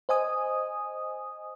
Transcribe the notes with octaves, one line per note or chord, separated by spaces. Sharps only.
C5 D#5 G#5 D#6